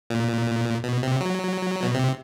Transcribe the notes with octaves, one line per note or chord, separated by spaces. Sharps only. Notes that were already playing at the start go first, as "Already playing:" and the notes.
A#2
B2
C3
F#3
B2
C3